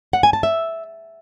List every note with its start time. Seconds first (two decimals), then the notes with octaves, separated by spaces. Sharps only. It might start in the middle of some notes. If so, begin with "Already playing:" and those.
0.13 F#5
0.23 G#5
0.33 A5
0.43 E5